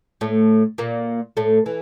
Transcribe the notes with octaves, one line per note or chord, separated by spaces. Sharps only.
A2 A3
A#2 A#3
A2 A3
E3